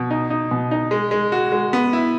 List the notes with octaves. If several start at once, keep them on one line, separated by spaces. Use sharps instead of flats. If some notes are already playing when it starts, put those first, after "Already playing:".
Already playing: B2
D#4
D#4
B2
D#4
G#3
G#3
F#4
G#3
B3
E4